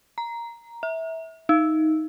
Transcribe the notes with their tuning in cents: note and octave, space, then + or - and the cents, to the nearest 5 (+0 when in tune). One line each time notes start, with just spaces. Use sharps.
A#5 +5
E5 -20
D#4 +10